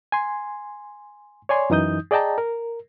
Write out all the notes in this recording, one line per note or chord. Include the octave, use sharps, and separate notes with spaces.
G#5 C6
C#5 D5 G#5 C6
F#2 E3 D#4 D#6 G6
G#4 D5 D#5 G5 A5 A#5
A#4